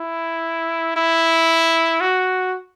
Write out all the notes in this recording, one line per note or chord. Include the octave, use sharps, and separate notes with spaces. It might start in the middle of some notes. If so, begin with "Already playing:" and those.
Already playing: E4
E4
F#4